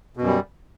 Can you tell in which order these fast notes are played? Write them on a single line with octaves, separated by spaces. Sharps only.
B2 F#2 G3